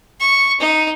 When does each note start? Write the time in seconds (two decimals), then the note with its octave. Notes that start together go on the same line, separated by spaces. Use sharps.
0.21 C#6
0.60 D#4